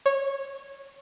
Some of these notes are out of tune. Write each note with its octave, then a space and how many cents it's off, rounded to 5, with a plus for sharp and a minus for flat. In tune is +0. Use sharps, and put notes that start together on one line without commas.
C#5 -15